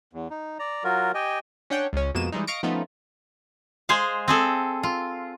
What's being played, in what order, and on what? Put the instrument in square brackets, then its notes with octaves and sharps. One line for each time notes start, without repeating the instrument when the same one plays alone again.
[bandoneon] E2
D#4
D5 A#5
F#3 F4 F#4 A#4
G4 D#5 G5 G#5
[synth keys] C#4 D4 C#5 F#5 G5
C#2 C#4
F2 B2 G#3 A#3 D#7 E7
E3 G3 G#3 D#4
D#5 F5 C#6 A#6 C#7 D7
F3 A3 B3 C#4 D#4 F4
[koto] G#3 G#4 C5 F5
C4 G#4 A4
F4